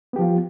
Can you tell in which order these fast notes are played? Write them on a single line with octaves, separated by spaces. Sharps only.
B3 G4 F3 F4